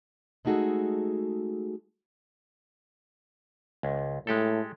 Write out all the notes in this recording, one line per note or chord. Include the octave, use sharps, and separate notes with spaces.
G#3 A3 D#4 F#4 G#4 A4
C#2
A2 G#3 G4 A4